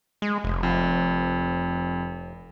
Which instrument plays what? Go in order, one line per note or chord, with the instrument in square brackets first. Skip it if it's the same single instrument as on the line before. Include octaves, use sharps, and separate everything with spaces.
[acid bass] G#3
F1
[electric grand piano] F2